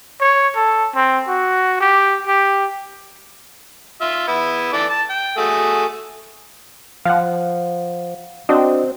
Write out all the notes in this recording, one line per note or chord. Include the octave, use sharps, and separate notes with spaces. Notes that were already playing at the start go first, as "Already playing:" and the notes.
C#5
A4
C4
F#4
G4
G4
F4 E5
B3 E4
E3 A4 D5
A5
G5
A3 F#4 G#4
F3 F5 F#5
C4 D4 F#4 D#5